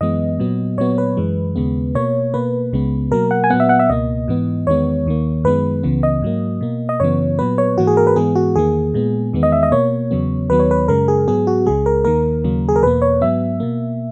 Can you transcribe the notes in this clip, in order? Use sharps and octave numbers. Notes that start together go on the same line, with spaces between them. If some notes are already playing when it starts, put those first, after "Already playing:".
F#2 E3 G#3 B3 D#5
A#2 F#3 B3
A#2 F#3 B3 C#5
B4
F#2 E3 G#3
D#2 C#3 G#3 B3
B2 A#3 C#5
B2 A#3 B4
C#2 C#3 G#3 B3
B2 F#3 A#3 A#4
F#5
G#5
A#2 F#3 B3 F#5
E5
F#5
E5
C#2 B2 A#3 D#5
G#2 E3 B3
E2 D#3 G#3 B3 C#5
D#2 D#3 A#3
F#2 D#3 G#3 B3 B4
C#2 C#3 E3 B3
D#5
G#2 F#3 A#3
B2 A#3
D#5
F#2 C#3 E3 B3 C#5
A#2 F#3 B3 B4
C#5
G#2 E3 A#3 F#4
G#4
A#4
B4
G#2 E3 G#3 B3 G#4
F#4
E2 D#3 A#3 G#4
A#2 G#3 B3
E2 D#3 G#3 B3
D#5
E5
D#5
B2 A#3 C#5
E2 C#3 F#3 B3
D#2 D#3 F#3 B3 B4
C#5
B4
F#2 C#3 G#3 A#4
G#4
G#2 F#3 B3 G#4
F#4
C#2 C#3 G#3 G#4
A#4
D#2 D#3 A#3 A#4
D#2 C#3 F#3 A#3
G#4
A#4
E2 B2 A#3 B4
C#5
G#2 F#3 B3 E5
B2 A#3